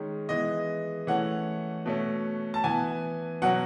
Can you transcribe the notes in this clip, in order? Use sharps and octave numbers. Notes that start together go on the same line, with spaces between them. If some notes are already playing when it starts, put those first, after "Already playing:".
Already playing: D#3 G#3 C#4
E3 G#3 B3 D#5
E3 A3 C#4 F#5
B2 A3 C#4
A5
E3 B3 G#5
B2 F#3 C#4 F#5